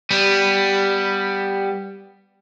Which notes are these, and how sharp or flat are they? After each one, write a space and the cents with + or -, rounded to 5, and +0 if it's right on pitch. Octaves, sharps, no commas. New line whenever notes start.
G3 +0 B3 +0